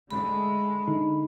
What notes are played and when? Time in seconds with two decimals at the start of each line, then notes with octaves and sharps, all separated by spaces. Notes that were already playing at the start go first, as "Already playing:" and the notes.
0.11 D3 G#3 A3 B5
0.88 D3 D#4